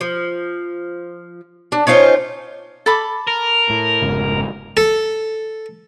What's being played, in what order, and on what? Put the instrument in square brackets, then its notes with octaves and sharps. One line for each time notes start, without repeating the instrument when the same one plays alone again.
[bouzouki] F3
D4
C#4 D#4 F4 C5
[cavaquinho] A4 B5 D6
[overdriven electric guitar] A#4
[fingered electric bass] A2
F1 G#2 C#3
[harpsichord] A4